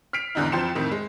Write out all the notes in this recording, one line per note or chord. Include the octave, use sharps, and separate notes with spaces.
F6 B6 C7 D7 F7
E2 G#2 D3 D#4 E4
F2 F3 G5 C6 C#7 E7
F2 A2 D#3
G#3